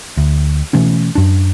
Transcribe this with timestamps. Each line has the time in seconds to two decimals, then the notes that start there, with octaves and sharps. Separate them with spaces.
0.17 D2
0.73 B2 E3 A3 C#4
1.15 F#2 D4